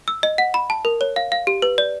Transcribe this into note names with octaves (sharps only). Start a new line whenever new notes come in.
E6
D#5
F#5
B5
A5
A#4
C#5
F5
F5
G4
B4
D5